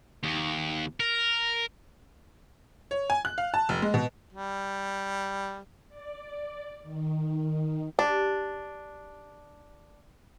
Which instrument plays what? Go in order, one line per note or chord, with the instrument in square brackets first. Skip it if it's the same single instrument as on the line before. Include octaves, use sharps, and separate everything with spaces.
[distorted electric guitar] D#2
A#4
[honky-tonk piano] C#5
G#5
F#6
F5
A5
F1
G#3
B2
[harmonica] G3
[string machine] D5
D#3
[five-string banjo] D4 [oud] G4